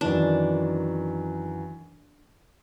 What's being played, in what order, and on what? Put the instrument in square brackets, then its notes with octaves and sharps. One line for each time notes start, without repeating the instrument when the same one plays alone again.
[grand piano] F#2 D#3 E3 [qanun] D4